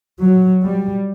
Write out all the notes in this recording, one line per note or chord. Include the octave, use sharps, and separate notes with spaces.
F#3
G3